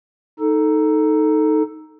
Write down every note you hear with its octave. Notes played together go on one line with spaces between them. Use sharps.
D#4 A4